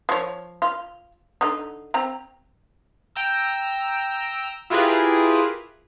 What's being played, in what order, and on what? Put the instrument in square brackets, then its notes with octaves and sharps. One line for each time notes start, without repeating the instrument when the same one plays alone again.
[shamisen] F3 C#5
F4
D3 D#4
C4 A#5
[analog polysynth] G5 A#5 E6
E4 F4 G4 G#4 A#4 B4